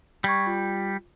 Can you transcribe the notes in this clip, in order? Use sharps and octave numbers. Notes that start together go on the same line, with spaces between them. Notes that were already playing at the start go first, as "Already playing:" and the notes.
G3 C#6 G#6 A#6
F4